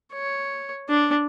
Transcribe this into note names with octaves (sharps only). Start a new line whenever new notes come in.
C#5
D4